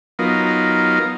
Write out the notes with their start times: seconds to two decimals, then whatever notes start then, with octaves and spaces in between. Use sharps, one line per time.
0.19 F#3 B3 D#4 F4 A#4